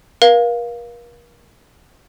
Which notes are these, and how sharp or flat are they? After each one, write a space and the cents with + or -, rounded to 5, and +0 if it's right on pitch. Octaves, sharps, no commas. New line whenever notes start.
A#4 +40 F5 +0